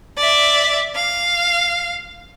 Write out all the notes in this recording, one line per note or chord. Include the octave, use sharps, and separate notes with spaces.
D5 E5
F5